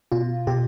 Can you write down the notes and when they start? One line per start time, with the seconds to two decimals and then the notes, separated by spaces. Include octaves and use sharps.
0.12 B2 F4
0.47 B2 G4